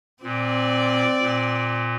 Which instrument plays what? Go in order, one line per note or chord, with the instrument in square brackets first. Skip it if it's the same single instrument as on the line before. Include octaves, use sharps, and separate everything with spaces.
[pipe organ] A#2 [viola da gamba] C4 D5
[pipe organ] A#2